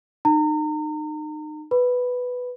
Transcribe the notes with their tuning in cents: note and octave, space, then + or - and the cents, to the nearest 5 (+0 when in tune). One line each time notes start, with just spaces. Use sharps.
D#4 -30 A#5 -35
B4 +5 B5 +0